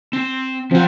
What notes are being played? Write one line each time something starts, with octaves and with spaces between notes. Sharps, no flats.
C4
F3 C4 F4 C5 F#5